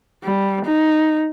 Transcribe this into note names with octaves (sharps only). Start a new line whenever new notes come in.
G3
D#4